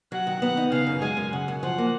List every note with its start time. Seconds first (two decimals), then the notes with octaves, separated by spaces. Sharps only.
0.12 F#3 F#5
0.27 D#3
0.42 B3 F#5
0.57 D#4
0.72 C#3 F5
0.87 F#2
1.02 G#3 G#5
1.17 F#2
1.32 C#3 F#5
1.48 F#2
1.63 F3 F#5
1.78 A#3